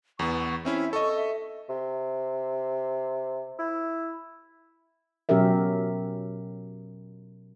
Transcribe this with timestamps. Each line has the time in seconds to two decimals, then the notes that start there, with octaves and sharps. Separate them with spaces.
0.19 E2 B3 C#6
0.65 C4 C#4 E4 E5
0.93 A4 D#5 C#6
1.16 E5
1.69 C3
3.59 E4
5.29 B2 F#3 C#4 G4 A#4 E5